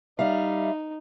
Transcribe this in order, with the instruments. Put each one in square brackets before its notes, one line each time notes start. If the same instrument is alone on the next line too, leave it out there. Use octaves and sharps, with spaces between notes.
[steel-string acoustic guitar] G3 E5 F5 [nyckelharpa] D#4